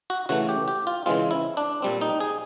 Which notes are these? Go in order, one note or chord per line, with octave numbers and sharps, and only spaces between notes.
F#4
C#3 E3 A3 F#4
G4
G4
F4
C#3 E3 G#3 C4 F4
E4
D4
A#2 G3 C4
D#4
G#4